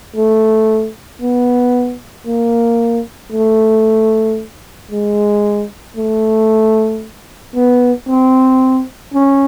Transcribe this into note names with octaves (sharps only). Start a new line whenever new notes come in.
A3
B3
A#3
A3
G#3
A3
B3
C4
C#4